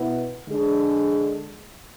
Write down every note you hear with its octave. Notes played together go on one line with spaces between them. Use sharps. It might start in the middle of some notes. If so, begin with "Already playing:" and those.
Already playing: B2 B3 E4
D3 G#3 D4 G#4